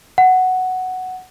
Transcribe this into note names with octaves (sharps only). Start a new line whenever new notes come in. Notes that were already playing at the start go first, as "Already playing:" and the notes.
F#5